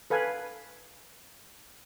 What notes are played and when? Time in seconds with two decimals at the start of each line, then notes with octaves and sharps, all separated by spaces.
0.10 A4 B4 F5 G#5